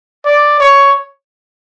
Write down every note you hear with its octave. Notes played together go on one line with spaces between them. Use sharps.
D5
C#5